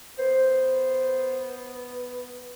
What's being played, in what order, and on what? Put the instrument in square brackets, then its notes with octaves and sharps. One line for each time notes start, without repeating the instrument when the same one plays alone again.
[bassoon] B3 [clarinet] C5